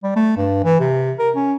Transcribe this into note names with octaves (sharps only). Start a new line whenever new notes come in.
G3
A3
G2
E3
C3
A#4
C#4